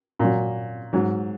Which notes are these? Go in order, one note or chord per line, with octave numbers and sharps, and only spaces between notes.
A#2 F#3
G#2 F#3